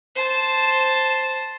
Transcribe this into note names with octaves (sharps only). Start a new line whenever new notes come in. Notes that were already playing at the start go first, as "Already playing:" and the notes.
C5 A5